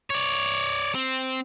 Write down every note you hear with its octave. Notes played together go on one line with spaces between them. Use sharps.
C#5 D5
C4